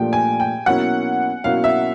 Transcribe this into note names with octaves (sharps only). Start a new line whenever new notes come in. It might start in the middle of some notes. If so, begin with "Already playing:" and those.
Already playing: A#2 F3 A3 D4 G4 G5
G#5
G5
B2 F#3 A#3 C#4 E4 F#5
B2 F#3 A#3 C#4 E4 F5
E5